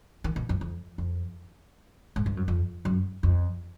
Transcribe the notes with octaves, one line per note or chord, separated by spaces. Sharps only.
D#3
B2
F2
F2
F2
G#2
G2
F#2
F2
F#2
F2